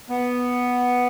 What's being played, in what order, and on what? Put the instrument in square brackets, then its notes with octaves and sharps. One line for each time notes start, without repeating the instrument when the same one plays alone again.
[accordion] B3